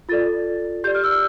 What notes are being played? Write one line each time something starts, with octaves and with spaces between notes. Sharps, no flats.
F4 A4 D5 A6
G4 D5 G6
F6
E6